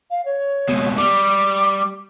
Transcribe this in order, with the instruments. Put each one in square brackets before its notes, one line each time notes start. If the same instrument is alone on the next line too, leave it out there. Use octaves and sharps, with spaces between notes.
[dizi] F5
C#5
[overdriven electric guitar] C#2 B2
[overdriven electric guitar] G3 [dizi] D6